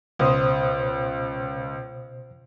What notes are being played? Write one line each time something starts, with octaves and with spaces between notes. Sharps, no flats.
C#2 B2 C5 D#6